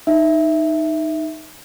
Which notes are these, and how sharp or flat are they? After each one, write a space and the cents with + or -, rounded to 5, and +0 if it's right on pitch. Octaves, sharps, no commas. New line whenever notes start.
D#4 +0 E5 +0